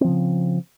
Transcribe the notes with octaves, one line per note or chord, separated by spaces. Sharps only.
C#3 F3 C4